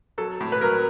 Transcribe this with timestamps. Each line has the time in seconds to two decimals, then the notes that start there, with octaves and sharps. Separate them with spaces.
0.18 F#3 A4
0.40 A2
0.52 B4
0.61 F#3 A#4